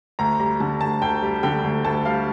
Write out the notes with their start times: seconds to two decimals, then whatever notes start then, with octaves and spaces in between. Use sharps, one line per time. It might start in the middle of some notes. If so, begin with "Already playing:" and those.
0.19 D2 A#5
0.39 G3 A#5
0.60 D3 A5
0.81 D2 A5
1.02 D2 G5
1.22 G3
1.43 D3 G5
1.64 D2
1.85 D2 A5
2.05 G3 F5